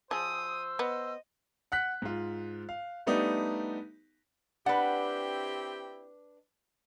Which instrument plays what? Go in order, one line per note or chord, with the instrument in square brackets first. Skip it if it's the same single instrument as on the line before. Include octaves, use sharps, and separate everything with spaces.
[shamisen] F3 G#4 [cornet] C5 [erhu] D#6 [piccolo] E6
[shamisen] B3 [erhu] D#5
[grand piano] F#5 F#6 B6
G#2 F4
F5
G3 A3 B3 D4 D#4 G4
[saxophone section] C4 E4 G4 [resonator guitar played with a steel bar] D4 B4 [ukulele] D5 F#5